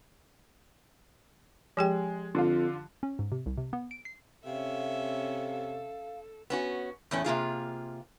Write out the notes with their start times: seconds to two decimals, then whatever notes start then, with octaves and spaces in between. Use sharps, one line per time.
1.77 F3 G#3 G4 G5
2.35 F2 D3 F4
3.03 C#4
3.19 G#2
3.32 C3
3.46 C2
3.58 C3
3.73 B3
3.91 D7
4.05 C7
4.46 C3 C#4 A4 E5 F5
6.50 B3 C#4 F#4
7.11 E2 A2 C#4
7.24 C3 A#3 F4 G#4